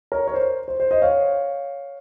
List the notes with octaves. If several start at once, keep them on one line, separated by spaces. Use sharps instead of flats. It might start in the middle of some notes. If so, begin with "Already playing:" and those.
A#4 C#5
C#5
C5
C5
C5
C5 D#5
C#5 F5